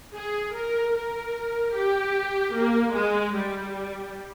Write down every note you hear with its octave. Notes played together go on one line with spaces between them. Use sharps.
G#4
A#4
A#4
G4
A#3
G#3
G3